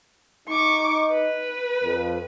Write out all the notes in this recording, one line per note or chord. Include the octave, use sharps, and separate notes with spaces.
D#4 C#6 D6
B4
F2